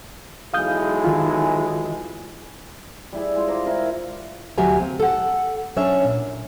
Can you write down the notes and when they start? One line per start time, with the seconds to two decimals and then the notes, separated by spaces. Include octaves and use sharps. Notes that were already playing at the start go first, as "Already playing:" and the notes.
0.54 B1 E3 G#3 F5 D#6 G6
1.05 D#3 F4
3.13 G3 E4 G#4
3.36 G#3 F4
3.48 C5 A#5 D6
3.66 E4 A#4 E5 G#5
4.58 D2 F#3 G4 E5 G#5 A#5
4.80 A#3 C4
5.00 A4 F#5
5.76 F#3 C#4 D4 C#5 E5
6.05 A#2